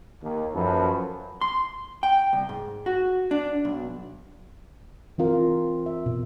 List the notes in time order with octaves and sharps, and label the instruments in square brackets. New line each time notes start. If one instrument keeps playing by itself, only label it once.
[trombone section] D#2
F#2 F3 A4 B4
[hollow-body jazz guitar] C6
G5
C2
G#2
F#4
D4
B1
[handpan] E3 C4 F4 A#4
E5
B2